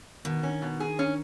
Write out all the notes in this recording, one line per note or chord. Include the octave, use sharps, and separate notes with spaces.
B2 D#3
C#4
B2
G#4
C#4